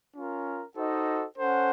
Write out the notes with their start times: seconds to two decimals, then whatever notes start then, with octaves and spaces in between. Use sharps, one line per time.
0.15 C#4 F4 A#4
0.76 D#4 F#4 A4 C5 D#5
1.38 C#4 A4 C5 F#5